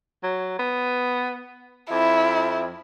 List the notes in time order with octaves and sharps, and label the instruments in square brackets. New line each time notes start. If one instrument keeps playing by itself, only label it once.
[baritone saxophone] F#3
B3
[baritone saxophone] F2 [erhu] E4